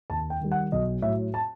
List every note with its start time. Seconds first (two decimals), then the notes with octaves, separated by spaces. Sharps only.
0.10 D#2 A5
0.30 G5
0.40 D#3 G3
0.52 F#5
0.72 B1 D#5
1.02 A2 F#3 E5
1.34 A5